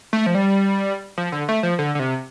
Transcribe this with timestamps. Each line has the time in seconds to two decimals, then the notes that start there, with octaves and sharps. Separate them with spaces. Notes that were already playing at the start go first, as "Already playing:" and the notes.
0.13 A3
0.26 F3
0.35 G3
1.17 F3
1.32 D3
1.49 A3
1.63 F3
1.79 D3
1.95 D3
1.99 C3